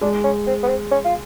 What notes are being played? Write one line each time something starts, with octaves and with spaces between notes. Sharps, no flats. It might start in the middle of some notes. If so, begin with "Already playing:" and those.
G#3 D4
C#4
C4
B3
C4
C#4
F4